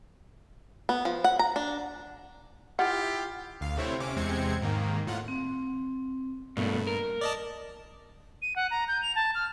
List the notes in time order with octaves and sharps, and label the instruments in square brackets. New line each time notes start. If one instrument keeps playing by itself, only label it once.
[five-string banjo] B3
F3
F#5
A#5
D4
[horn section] E4 F4 G4 [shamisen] F#5
[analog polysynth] D2 F5
C3 A3 C4 E4 C#5
C3 C#4 D6
E2 C3 G#3 C4 G#6 C#7
G#2 D#3 A#3
A2 F4 F#5
[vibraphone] C4
[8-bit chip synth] G2 [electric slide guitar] B2 A3 A#3
[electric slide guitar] A#4
[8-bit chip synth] D5 D#5 A5
[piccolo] D#7
F#5
A#5
G6
F7
A5
F6